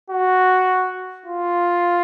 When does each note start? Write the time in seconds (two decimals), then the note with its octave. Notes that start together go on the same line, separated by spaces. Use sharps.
0.10 F#4
1.26 F4